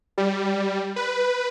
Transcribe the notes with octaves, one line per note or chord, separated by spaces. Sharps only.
G3
B4